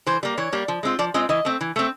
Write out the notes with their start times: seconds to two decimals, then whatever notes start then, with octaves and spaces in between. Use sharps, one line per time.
0.06 E3 C5
0.23 G3 A#3
0.38 E3 C#5
0.53 G3 A#3
0.68 F3
0.83 G#3 C4 F4
0.99 F3 D5
1.14 G#3 C4 F4 D#5
1.29 E3 D#5
1.45 A3 C4
1.61 E3
1.76 A3 C4